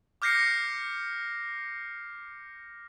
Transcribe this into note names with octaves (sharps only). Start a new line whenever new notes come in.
D6 F6 G6 A#6 C7 C#7